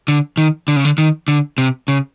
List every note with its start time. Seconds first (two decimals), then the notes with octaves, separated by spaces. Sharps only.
0.08 D3
0.37 D#3
0.68 D3
0.76 C#3
0.85 D3
0.98 D#3
1.28 D3
1.58 C3
1.88 C#3